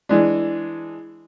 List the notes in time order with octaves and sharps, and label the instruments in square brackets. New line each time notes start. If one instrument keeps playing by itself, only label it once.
[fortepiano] E3 G#3 D4